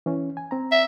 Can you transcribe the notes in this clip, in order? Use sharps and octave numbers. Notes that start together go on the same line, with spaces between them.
E3 C#4
G#5
C4 A#5
E5